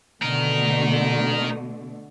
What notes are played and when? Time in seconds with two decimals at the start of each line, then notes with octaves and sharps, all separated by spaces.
0.22 B2 D3 A3 D#4 A#4